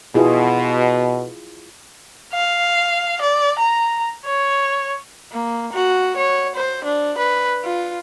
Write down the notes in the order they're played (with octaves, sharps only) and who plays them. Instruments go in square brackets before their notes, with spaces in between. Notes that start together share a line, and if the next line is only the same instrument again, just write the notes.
[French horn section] B2 [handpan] E4 F4 G#4
[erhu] F5
D5
A#5
C#5
[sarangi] A#3
F#4
C#5
C5
D4
B4
F4